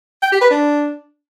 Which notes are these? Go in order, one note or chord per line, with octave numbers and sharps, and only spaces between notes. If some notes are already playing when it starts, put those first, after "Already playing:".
G5
G4
B4
D4